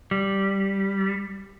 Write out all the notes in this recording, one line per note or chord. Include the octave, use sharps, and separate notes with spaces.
G3